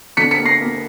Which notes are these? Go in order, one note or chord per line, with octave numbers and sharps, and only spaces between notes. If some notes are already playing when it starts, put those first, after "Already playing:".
D3 B6 C#7
B6 C#7
A#3
A#6 C7
A#3